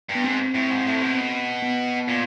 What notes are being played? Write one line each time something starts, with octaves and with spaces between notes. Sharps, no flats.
G2
B3
G#2 C4
A2
G#2
A2
B2
B3
A#2